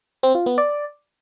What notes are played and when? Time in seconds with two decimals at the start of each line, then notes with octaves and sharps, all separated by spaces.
0.23 C4
0.35 F4
0.46 B3
0.58 D5